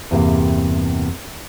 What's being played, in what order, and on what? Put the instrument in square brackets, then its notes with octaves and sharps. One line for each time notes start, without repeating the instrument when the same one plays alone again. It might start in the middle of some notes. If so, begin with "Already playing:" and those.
[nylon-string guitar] E2 G2 C3 A#3